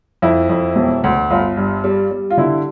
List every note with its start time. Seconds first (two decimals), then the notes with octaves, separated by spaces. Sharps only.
0.22 F2 E4
0.49 F2
0.76 E1
1.04 D2
1.30 G1 F4
1.57 G2
1.84 G3
2.11 G3
2.30 F4
2.37 D3 E4